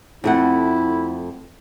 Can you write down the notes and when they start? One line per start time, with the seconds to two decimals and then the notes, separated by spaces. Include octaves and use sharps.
0.24 F2 A3 E4 F#5